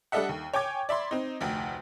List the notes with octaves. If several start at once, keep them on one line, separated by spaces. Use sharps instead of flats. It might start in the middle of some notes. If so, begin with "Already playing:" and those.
G3 D4 A4 D#5 E5 F#5
D#2
C#5 G5 G#5 D6 G#6
D5 E5 B5 C6
C4 D#4
F1 D2